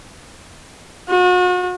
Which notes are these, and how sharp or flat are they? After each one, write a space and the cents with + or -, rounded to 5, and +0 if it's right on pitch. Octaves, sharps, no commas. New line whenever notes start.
F#4 -40